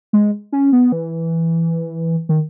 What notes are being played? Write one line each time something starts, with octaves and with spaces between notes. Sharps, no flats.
G#3
C#4
B3
E3
D#3